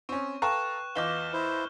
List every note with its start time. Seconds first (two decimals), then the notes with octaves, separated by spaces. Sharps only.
0.09 C4 C#4 C#6
0.42 A4 B4 F5 G5 A#5 C#6 F#6 E7
0.96 E2 F4 B4 D#5 D6 F6 G6 G7
1.33 E4 C5